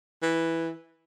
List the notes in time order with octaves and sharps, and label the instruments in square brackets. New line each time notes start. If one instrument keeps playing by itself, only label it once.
[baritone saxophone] E3